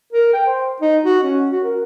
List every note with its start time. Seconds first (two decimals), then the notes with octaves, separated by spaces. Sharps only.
0.12 A#4
0.33 G5
0.46 C5
0.81 D#4
1.05 F#4
1.23 C#4
1.51 F#4
1.64 A#4